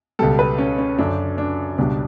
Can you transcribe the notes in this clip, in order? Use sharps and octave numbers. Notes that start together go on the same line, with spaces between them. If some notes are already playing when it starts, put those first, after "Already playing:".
C#2 B2 G3 A4
B4
C#4
C#4
F#2 D3 F#3 D4
D4
C#2 B2 G3 D4